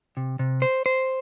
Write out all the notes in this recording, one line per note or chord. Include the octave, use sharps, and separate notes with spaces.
C3
C3
C5
C5